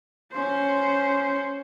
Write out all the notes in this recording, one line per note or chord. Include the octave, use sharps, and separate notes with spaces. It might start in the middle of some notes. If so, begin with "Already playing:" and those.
C#4 C5